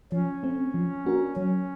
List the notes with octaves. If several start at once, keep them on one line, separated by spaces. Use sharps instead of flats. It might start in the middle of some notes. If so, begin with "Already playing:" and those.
F3 C#4
A3 C4
F3
A#3 D4 F#4 A#4
F#3 C#4